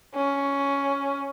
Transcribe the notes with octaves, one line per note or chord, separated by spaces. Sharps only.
C#4